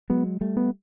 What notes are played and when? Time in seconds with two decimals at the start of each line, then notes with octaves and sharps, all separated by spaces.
0.10 F#3 G#3 B3
0.41 G3 A3
0.57 B3